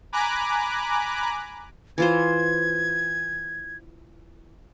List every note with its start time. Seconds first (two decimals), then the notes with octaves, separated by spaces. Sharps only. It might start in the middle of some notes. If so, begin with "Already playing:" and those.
0.12 G#5 A#5 B5 D6 F#6
1.98 E3 F4 C5 G#6